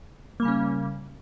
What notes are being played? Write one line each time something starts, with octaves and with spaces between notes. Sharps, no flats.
C#3 G3 A#3 C#4